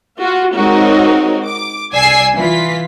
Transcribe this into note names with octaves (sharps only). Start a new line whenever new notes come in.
F4 F#4
G#3 C4 D#4 F#4 A#4 C#5
D6
C2 D5 G#5 E6 G#6 C7
E3 F4 B6